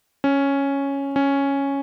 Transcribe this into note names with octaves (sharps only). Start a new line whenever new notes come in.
C#4
C#4